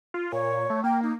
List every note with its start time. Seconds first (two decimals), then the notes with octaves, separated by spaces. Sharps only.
0.14 F4
0.32 A#2 C#5
0.70 A3
0.84 A#3 G5
1.02 D#4